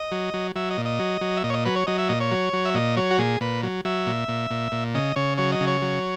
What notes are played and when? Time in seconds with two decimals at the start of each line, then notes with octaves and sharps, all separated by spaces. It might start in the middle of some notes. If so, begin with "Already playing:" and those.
Already playing: D#5
0.11 F#3
0.34 F#3
0.56 F#3 E5
0.71 D#5
0.78 A#2
0.85 D#5
0.99 F#3
1.21 F#3
1.37 E5
1.44 A#2 D#5
1.50 C#5
1.54 D#5
1.65 F#3 B4
1.76 C#5
1.87 F#3 D#5
1.98 E5
2.09 A#2 D#5
2.20 C#5
2.31 F#3
2.53 F#3
2.65 E5
2.74 A#2 D#5
2.97 F#3 C#5
3.11 F#4
3.18 A#2 G#4
3.41 A#2 B4
3.63 F#3
3.85 F#3 E5
4.07 A#2
4.28 A#2
4.50 A#2
4.72 A#2
4.95 C#3 D#5
5.16 C#3 C#5
5.38 F#3 C#5
5.52 D#5
5.61 C#3
5.67 C#5
5.82 F#3